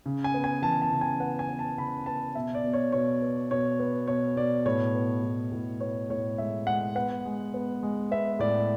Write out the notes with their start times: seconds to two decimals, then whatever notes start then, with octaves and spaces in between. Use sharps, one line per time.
0.06 C#3
0.24 G#5
0.34 B3
0.44 G#5
0.62 E3 A5
0.82 A5
0.91 C#3
1.01 G#5
1.20 B3 F#5
1.39 G#5
1.49 B3
1.59 A5
1.78 C#3 B5
2.06 B3 A5
2.35 B2 E5
2.55 D5
2.64 B2
2.73 C#5
2.92 B2 C#5
3.22 B3
3.51 B2 C#5
3.80 B3
4.08 B2 C#5
4.36 B2 D5
4.66 A2 C#5
4.95 B3
5.23 A2
5.52 A2
5.80 B3 C#5
6.10 A2 C#5
6.38 G#3 E5
6.67 G#3 F#5
6.95 B3 F#5
7.25 G#3
7.54 B3
7.83 G#3
8.11 B3 E5
8.39 A2 D5